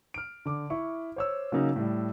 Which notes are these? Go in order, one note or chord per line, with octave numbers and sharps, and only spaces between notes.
F6 D7
D3 D6
E4 C#6
C5 C#5 E6
C#3 F#3 A#3 C#4 D#4
A2 G3